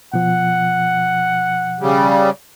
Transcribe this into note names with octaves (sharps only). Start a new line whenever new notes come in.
B2 F3 F#5
C#3 G3